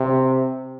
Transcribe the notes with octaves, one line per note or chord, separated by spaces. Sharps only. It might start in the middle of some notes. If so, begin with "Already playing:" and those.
Already playing: C3